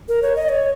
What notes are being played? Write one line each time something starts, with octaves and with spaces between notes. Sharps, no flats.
A#4
C#5
D#5
C#5